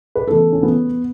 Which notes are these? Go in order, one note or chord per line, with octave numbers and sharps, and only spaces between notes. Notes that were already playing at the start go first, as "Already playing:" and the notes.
B4
E2 C#3 E3 A3 A4
C#4
B3